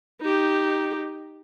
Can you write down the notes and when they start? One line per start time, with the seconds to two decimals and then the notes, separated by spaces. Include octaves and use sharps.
0.21 D#4 G4